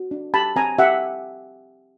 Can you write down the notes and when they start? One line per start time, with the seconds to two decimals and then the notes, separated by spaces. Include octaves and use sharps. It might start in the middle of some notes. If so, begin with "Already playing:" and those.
Already playing: F#4
0.11 D4
0.34 G4 A5 B5
0.56 C4 G#5 A#5
0.78 G4 E5 F#5